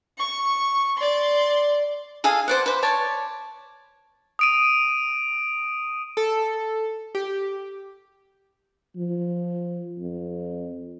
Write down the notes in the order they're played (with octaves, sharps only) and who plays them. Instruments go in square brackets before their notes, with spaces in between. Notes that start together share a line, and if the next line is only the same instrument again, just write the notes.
[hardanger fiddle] C#6
D5 C6
[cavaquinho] G#4 A4 F5 G#5
C5 D5 F#5
B4 C5
C#5 D5 A5
[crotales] D#6 D7 D#7
[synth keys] A4
G4
[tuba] F3
F2